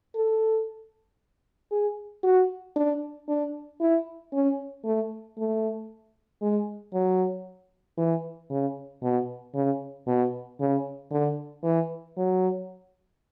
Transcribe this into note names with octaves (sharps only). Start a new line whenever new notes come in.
A4
G#4
F#4
D4
D4
E4
C#4
A3
A3
G#3
F#3
E3
C#3
B2
C#3
B2
C#3
D3
E3
F#3